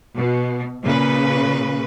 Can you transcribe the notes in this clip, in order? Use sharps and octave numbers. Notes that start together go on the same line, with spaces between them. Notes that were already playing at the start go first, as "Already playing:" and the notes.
B2
A#2 C#3 B4